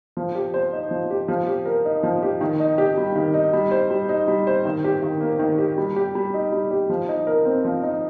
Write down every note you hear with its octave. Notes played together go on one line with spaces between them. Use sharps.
F3
G4
C5
D#4
F3
G4
F3
G4
A#4
D#4
F3
G4
D#3
D#4
G4
G3
D#3
D#4
G3
C5
G3
D#4
G3
C5
D#3
G4
D#3
A#3
D#3
G4
G3
G4
G3
D#4
G3
G4
F3
D#4
A#4
C4
F3
D#4